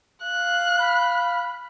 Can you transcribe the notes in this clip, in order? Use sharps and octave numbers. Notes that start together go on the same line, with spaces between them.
F5 F#6
B5